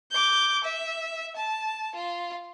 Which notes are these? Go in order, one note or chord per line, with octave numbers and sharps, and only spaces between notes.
D6 G6
E5
A5
F4